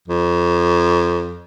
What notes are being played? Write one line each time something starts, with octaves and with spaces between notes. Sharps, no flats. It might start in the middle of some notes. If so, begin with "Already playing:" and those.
F2